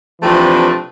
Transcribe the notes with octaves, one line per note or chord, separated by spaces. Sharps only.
C3 E3 F3 A3 C4 D4